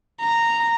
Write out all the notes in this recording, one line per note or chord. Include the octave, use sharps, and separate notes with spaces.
A#5